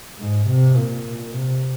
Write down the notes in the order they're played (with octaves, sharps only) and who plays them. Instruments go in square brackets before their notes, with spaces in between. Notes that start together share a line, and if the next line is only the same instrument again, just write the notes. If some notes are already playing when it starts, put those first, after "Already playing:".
[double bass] G#2
C3
A#2
C3